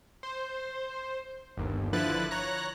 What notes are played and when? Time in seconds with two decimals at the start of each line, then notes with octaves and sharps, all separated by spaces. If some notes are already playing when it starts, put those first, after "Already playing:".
0.23 C5
1.57 G1 D#2
1.93 D3 F3 E4 B4 F#6 A6
2.31 C#5 A#5 F#6 A#6